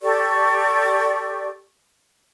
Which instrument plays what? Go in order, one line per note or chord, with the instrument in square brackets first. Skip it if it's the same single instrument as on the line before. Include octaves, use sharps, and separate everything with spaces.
[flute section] G4 A4 D5 C#6